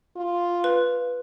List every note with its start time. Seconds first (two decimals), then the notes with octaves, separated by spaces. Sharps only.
0.16 F4
0.64 B4